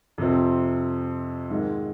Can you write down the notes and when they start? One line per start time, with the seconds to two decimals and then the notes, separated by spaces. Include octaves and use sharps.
0.18 F2 C3 F3 C4
1.50 G#2 D#3 G#3